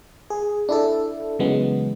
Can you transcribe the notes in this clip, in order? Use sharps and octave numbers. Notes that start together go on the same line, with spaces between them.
G#4
D4 E4 A4
C#3 E3 F#3 G#3 B3